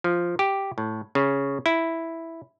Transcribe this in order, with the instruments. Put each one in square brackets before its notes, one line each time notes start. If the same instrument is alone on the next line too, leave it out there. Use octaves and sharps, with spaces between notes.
[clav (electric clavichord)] F3
G4
A2
C#3
E4